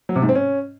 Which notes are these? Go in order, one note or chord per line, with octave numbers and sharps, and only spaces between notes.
F#3
C3
G#2
C4
C#4